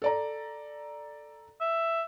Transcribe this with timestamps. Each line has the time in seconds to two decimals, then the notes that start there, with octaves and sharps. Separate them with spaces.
0.02 A4 D5 A#5
1.60 E5